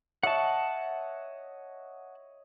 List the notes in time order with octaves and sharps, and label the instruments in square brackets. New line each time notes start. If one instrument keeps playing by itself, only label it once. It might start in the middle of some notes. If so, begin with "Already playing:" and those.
[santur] C#5 D#5 E5 [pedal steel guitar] F#5 A5